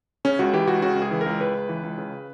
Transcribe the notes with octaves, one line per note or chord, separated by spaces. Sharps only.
C#3 C#4
C#2 F#4
E3 G4
C#2 F#4
C#3 F#4
C#2
G#4
E3
C#2 A#4
C#3 B4
C#2
E3
C#2
C#3